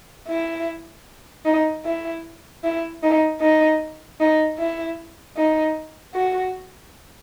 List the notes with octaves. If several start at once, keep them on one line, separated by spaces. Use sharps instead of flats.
E4
D#4
E4
E4
D#4
D#4
D#4
E4
D#4
F#4